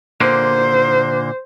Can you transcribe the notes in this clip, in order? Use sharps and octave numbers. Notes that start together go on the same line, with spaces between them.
A#2 D3 A#3 C5